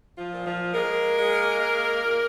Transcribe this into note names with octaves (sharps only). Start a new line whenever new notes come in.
F3 F4
A#2
F3 F4
G#3 A#3 A#4
G#3
G#3
A#2